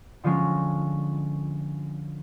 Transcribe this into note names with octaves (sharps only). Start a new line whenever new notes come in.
D3 F3 G#3 C#4